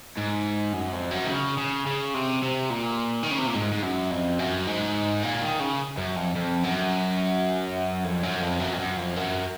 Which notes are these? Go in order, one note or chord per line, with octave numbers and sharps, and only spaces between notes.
G#2
F#2
F2
F#2
D#3
C#3
C#3
C#3
C3
C3
A#2
D#3
C#3
C3
A#2
G#2
G#2
F#2
F2
F#2
G#2
A#2
D#3
C#3
F#2
F2
F2
F#2
F2
F#2
F2
F#2
F2
F#2
F2
F#2